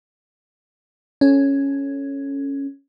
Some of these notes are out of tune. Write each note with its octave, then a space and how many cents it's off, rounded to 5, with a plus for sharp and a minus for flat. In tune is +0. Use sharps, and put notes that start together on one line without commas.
C#4 +0 A4 +0